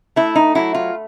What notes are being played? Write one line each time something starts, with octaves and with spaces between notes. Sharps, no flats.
A3 E4
D#4
F#3 E4
F4